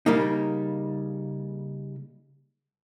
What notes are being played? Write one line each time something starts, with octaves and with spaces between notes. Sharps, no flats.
C#3 G3 A#3 D#4